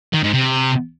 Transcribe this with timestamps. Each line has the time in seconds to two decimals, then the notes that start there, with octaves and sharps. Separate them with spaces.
0.13 D#3
0.23 G#2
0.33 C3